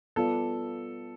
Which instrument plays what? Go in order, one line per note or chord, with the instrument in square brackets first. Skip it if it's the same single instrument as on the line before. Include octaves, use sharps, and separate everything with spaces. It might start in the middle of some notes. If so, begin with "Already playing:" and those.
[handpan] G3 B3 F4 B4 D5 [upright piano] A4